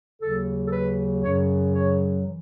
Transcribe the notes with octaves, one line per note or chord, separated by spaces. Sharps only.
D#2 C#3 F#3 A4
A4
B4
F#2 C#3 F#3 C#5
C#5
E3